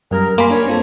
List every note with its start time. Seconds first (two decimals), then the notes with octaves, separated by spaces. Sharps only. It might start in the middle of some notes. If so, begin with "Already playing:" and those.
0.11 F#2 G3 A#4
0.38 A#3 G#5 B5 C6
0.50 D4 C#5
0.67 C4 F4 A4